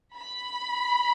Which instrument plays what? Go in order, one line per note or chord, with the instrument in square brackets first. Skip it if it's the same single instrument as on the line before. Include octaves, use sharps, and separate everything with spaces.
[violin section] B5